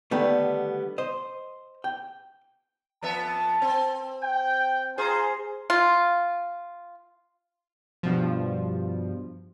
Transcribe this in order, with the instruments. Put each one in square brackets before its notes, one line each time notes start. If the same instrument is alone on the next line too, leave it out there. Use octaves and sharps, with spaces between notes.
[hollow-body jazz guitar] D3 D#3 G3 A3 B3
C5 D#5
G5
[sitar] F2 B3 E5 [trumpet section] A5
[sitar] C4
[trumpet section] G5
[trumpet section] F4 A#5 C6 [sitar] G#4 C5
[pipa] F4
[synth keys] G2 B2 F3